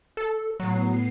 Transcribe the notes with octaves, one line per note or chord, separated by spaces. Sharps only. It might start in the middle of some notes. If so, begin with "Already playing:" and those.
A4
A2 F#3 B3 C7